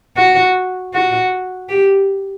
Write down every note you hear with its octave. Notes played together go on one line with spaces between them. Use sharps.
F#4
F#4
G4